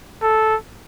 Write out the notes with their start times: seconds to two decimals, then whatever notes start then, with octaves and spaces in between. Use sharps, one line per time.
0.22 A4